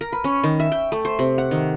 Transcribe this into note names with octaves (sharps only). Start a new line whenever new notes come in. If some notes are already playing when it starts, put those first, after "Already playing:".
A#4
B4
C#4
D#3
E5
G5
A3
C5
C3
F#5
D#3